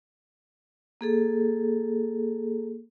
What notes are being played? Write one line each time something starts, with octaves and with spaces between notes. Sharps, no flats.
A#3 G#4 A4